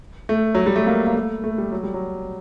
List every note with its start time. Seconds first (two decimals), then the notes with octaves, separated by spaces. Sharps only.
0.29 A3
0.55 F#3
0.66 G3
0.76 A3
0.87 A#3
1.06 A#3
1.14 A3
1.44 A3
1.58 G3
1.72 F#3
1.83 G3
1.94 F#3